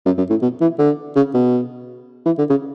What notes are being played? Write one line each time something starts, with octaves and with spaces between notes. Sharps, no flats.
F#2
F#2
A2
B2
E3
D3
C#3
B2
E3
D3
C#3